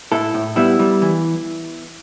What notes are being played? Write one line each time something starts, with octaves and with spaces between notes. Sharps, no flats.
A2 E4 A4
A2
G3 B3 E4
G3
E3